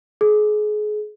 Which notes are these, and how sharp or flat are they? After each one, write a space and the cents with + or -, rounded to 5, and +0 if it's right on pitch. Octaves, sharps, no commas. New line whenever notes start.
G#4 +30